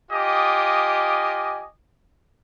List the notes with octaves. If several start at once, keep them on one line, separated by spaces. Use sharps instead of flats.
F4 G4 D#5 G#5 D6 D#6